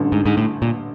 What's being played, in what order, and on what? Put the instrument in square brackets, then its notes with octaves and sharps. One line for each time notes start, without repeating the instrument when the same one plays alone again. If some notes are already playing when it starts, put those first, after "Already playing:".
Already playing: [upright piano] A1 G2 D3
[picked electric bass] G#2
G#2
A2
A#2